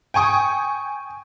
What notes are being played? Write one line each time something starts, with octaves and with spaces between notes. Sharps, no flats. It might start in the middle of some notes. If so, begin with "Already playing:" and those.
G5 G#5 C#6 D#6